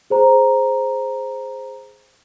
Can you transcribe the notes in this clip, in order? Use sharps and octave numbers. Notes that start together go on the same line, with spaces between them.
G#4 C5 A#5